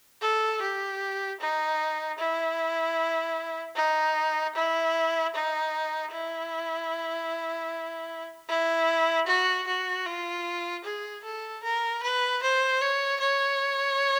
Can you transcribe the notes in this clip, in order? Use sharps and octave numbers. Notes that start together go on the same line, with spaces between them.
A4
G4
D#4
E4
D#4
E4
D#4
E4
E4
F#4
F#4
F4
G#4
A4
A#4
B4
C5
C#5
C#5